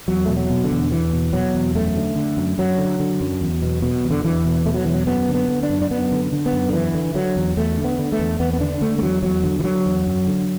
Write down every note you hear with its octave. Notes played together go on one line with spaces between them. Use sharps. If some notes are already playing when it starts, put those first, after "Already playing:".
E2 F#3
B2 A3
F#3
B2
D3
E2
E2 E3
B2
B2 F#3
E2
F#2 A3
D3
D3
F#2
F#2 F#3
D3
D3
F#2
E2
B2
B2
E2
D3
E2 E3
B2
B2 A3
F#3
E2 E3
F#3
F#2 B3
D3
B3
D3
D4
F#2
D4
F#2 B3
D3
D3
B3
F#2
D3
E2 E3
D3
D3 F#3
E2
E2 A3
D3
B3
D3
A3
E2
E2 B3
B3
D3 D4
D3 A3
A3
E2 F#3
E2 F#3
D3
E3
D3 F#3
E2
F#2
D3